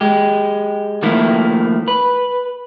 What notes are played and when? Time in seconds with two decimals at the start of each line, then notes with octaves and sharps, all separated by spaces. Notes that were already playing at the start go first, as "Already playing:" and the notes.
0.01 G#3 G4
1.02 D#3 F3 A3 A#3 E4
1.88 B4